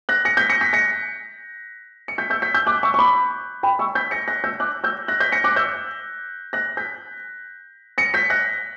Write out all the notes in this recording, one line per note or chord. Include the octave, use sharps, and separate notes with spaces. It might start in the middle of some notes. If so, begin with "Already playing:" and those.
F#6 A#6
A#6 C#7
G6 B6
A#6 C#7
G6 B6
A#6 C#7
C#7
G6 B6
E6 G6
G6 B6
E6 G6
D6 F#6
C#6 E6
C#6
B5 D6
G5 B5
C#6 E6
G6 B6
A#6 C#7
F#6 A#6
E6 G6
D6 F#6
E6 G6
F#6 A#6
G6 B6
A#6 C#7
D6 F#6
E6 G6
F#6 A#6
G6 B6
A#6 C#7
G6 B6
F#6 A#6